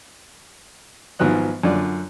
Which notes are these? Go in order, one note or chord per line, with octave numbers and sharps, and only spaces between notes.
G#1 G#2 F3 F#3 B3 F#6
F#2 D3 F4 D5